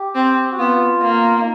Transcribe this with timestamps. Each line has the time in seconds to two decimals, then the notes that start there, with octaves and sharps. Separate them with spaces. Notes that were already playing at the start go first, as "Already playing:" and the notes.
Already playing: G4
0.15 C4
0.52 F#4
0.58 B3 F4
1.01 A#3
1.40 D#4